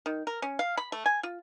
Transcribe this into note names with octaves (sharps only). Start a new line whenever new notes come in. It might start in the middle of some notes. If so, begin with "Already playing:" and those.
D#3
A#4
C#4
F5
B5
A3
G#5
F4